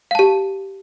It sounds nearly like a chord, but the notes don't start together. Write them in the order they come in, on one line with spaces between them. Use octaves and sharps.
F5 A5 G4